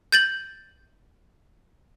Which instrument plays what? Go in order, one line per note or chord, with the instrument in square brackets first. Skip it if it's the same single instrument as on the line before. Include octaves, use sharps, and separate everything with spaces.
[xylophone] G6 A6 F#7